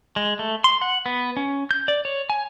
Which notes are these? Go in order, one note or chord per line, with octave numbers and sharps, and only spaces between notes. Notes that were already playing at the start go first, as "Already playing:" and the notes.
G#3
A3
C6
F#5
B3
C#4
G6
D5
C#5
G#5